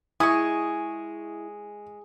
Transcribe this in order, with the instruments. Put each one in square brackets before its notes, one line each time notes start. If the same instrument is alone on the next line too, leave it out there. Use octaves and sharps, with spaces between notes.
[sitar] G#3 [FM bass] E4 [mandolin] G#5 C#6 [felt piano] D#6